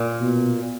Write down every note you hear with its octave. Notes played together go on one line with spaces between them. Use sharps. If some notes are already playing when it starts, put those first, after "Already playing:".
Already playing: A#2
B2